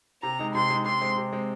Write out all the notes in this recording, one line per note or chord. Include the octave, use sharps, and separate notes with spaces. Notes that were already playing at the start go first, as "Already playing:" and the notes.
C3 A#5
G#3 D#4
C3 C6
G#3 D#4
C3 C6
G#3 C4
C3
G#3 C4